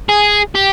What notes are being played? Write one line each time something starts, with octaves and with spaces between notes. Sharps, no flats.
G#4
G4